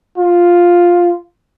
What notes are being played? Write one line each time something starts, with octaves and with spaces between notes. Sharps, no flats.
F4